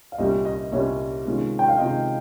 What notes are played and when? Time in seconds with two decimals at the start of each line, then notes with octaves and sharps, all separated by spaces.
0.12 F5
0.18 C2 A#2 G3 C#4 D#5
0.45 D#5
0.72 C2 A#2 G3 C#4 C#5
1.25 C3 D#3 G#3 C#4 F4
1.59 G5
1.68 F5
1.78 C3 D#3 G#3 C#4 F4 D#5